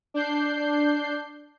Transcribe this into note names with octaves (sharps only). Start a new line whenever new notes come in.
D4 G6 C7